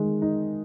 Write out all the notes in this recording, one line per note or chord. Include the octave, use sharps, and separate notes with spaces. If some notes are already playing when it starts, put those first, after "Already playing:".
Already playing: D#3 G#3
D#4